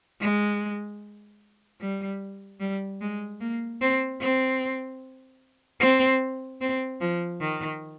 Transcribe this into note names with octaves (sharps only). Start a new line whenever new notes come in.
G#3
G3
G3
G#3
A#3
C4
C4
C4
C4
F3
D#3